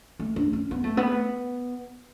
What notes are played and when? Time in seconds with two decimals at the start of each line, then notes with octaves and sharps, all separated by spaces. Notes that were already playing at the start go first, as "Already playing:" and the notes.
0.19 A3
0.36 D4
0.53 C#4
0.71 B3
0.84 A3
0.97 B3